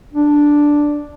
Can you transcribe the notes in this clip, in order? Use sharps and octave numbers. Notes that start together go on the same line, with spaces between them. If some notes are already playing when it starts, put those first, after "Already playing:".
D4